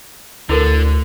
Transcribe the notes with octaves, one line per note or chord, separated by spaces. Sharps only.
D2 D3 E4 A4 A#4